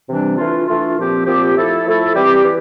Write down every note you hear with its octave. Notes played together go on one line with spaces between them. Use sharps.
C3 E3 G3 D4
E3 A3 D4 F4
E3 A3 D4 F4
A#2 F3 C4 G4
A#2 F3 C4 G4
F3 A3 E4 A4
F3 A3 E4 A4
E3 G3 C4 G4
E3